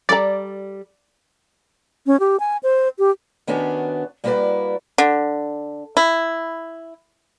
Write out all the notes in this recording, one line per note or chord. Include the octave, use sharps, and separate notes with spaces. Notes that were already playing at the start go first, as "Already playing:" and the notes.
G3 A4 D5 A#5
C#4
G4
G#5
C5
G4
D#3 B3 C#4 D4 F#4 G4
G3 A#3 E4 F#4 B4 D5
D3
E4